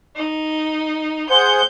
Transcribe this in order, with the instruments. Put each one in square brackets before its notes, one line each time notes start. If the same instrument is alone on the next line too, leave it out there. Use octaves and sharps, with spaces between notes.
[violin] D#4
[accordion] G#4 C5 F#5 [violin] G6